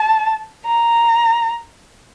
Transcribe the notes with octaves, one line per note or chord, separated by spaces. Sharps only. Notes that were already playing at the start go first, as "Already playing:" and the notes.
Already playing: A5
A#5